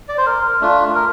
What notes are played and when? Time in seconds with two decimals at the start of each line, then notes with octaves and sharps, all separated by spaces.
0.09 D5
0.18 C5
0.26 A#4
0.61 A3 D4 F4
0.95 A#4